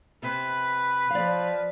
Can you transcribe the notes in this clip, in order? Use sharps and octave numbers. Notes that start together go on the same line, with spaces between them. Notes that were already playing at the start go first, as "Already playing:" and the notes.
C3 B4
F3 D5 F5